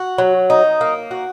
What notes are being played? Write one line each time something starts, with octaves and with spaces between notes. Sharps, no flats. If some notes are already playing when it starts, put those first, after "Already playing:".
Already playing: F#4
F#3
D#4
A#3
F#4